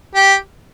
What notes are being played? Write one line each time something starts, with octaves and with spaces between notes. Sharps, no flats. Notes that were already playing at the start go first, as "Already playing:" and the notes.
G4